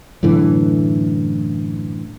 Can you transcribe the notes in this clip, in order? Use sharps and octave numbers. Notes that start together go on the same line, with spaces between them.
F#2 A2 D3 E3